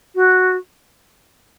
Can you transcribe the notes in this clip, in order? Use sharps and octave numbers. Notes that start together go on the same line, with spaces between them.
F#4